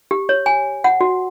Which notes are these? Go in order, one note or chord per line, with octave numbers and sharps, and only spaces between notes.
G4
C#5
G#5
F#5
F#4